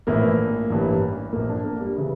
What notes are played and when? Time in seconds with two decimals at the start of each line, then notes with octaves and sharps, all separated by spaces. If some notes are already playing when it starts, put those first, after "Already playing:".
0.07 A#1 A2 E3 A#3
0.70 A1 G2 E3
1.33 A#1 A#2 A#3
1.49 D4
1.65 A#3
1.80 G3
1.96 C#3 E3